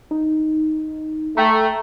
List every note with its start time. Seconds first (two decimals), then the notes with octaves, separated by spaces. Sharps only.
0.11 D#4
1.37 A3 G5 A#5